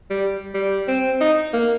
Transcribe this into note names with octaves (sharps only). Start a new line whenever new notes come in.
G3
G3
C4
D#4
A#3